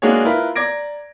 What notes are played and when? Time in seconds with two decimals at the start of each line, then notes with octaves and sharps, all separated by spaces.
0.02 G#3 A#3 D4 F#4 G#4 C#5
0.25 E4 F4 A#4 B4
0.56 D5 A#5 D6 G#6 A#6 D7